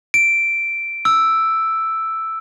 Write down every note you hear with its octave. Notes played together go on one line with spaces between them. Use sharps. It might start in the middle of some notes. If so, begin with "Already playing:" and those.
D7
E6